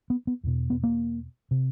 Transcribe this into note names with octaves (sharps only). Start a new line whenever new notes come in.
B3
B3
E2 B2
B3
A#3
C3